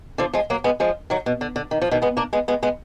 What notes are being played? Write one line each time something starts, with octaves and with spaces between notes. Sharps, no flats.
D3 F3
F3 G#3
F#3 A#3
G#3 B3
F3 G#3
D#3 F#3
B2
D3
D3
D#3
F3
B2 D#3
G#3 B3
A#3 D4
G#3 B3
G#3 B3
G#3 B3